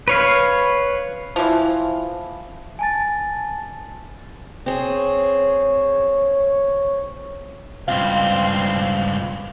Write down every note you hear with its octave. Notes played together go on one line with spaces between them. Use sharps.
B4 C#5 F5
E3 F3
G#5 A5 A6
C4 G#4 C#5
C#2 G2 C4 F4 F5